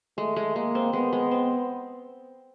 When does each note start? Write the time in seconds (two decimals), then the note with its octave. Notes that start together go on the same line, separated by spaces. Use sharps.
0.18 G#3 A3
0.36 G#3
0.56 G#3 A#3
0.75 C4
0.93 G#3 B3
1.13 G#3
1.31 C4